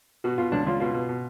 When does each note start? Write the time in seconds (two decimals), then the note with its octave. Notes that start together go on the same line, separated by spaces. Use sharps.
0.24 B2 F#4
0.38 B2 F4
0.52 C#2 D4
0.66 C#2 F4
0.80 B2 F4
0.94 B2
1.09 B2